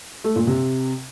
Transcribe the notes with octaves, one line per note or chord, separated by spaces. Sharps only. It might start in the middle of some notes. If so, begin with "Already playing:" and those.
A3
A#2
C3